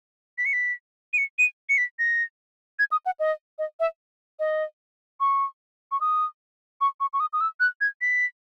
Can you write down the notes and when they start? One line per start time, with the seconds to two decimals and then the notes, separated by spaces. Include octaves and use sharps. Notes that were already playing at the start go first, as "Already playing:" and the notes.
0.38 B6
0.46 C#7
0.53 B6
1.13 D#7
1.18 C#7
1.39 D#7
1.69 C#7
1.78 B6
1.99 A#6
2.79 G#6
2.92 D#6
3.06 F#5
3.20 D#5
3.59 D#5
3.80 E5
4.39 D#5
5.20 C#6
5.92 C#6
6.01 D#6
6.81 C#6
7.00 C#6
7.13 C#6
7.20 D#6
7.33 D#6
7.41 E6
7.60 F#6
7.81 G#6
8.01 B6